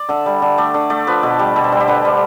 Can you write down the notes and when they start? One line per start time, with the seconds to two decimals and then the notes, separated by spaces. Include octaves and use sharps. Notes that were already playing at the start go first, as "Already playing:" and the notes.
Already playing: D5
0.09 D3 E5
0.26 G3
0.42 D3
0.58 A3 D5
0.74 D3
0.90 A3 D5
1.07 F3 B4
1.23 B2 A4
1.39 G3 G4
1.56 B2 A4
1.64 C5
1.72 G3 A4
1.80 G4
1.88 D3 B4
2.05 G3 C5